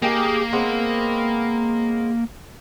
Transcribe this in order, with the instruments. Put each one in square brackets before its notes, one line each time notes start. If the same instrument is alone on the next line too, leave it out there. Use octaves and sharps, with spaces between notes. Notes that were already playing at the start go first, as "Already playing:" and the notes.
[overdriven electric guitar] A#3 [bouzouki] D#4 G4 G#4
[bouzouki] G#3 B3 C4